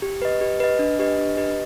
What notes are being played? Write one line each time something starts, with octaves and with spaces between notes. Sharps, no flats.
G4
B4 D#5
G4
B4 D#5
D4
G4 B4 D#5
D4
G4 B4 D#5